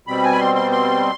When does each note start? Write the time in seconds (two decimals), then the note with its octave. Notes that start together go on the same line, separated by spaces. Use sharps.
0.07 B2 G3 C4 B5
0.23 G#5
0.33 B5
0.39 C6
0.55 C6
0.72 C6